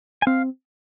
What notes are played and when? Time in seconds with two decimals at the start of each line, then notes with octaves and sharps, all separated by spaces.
0.22 G#5
0.27 C4 F5